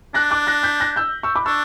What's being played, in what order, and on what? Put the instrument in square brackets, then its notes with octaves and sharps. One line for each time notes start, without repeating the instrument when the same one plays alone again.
[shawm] D4 [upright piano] F#6 A#6
[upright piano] D6 F#6
F#6 A#6
G6 B6
F#6 A#6
E6 G6
C#6 E6
B5 D6
[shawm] D4 [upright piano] C#6 E6